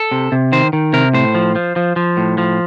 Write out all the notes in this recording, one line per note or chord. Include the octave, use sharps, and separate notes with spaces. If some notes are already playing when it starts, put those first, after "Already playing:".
Already playing: A4
C3
C3
D#3 C5
D#3
C3 A#4
A2 C5
F3
F3
F3
F3
A2
F3